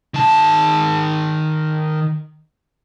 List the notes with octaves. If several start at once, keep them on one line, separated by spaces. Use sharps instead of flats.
D#3 A5